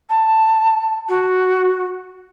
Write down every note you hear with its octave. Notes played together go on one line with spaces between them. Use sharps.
A5
F#4